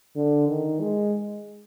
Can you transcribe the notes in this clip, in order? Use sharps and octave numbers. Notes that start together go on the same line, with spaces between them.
D3
D#3
G#3